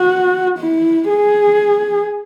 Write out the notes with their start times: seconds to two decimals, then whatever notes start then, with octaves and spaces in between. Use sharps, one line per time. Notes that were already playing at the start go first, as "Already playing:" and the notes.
Already playing: F#4
0.58 E4
1.09 G#4